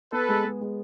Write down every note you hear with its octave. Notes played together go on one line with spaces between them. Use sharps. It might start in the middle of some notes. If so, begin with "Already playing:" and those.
B3 A4 B4
G#3
G#3
G#3